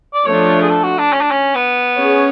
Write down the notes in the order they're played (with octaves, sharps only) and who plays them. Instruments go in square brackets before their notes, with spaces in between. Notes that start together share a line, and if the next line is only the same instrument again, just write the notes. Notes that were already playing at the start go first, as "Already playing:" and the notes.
[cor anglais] D5
[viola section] F3 A3 D4 [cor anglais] C#5
[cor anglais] G#4
A4
F#4
D4
C#4
D4
C#4
B3
[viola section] C#4 G#4 C#5